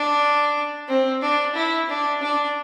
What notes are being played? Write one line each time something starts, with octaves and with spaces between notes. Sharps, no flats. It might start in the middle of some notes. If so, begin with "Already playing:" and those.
Already playing: D4
C4
D4
E4
D4
D4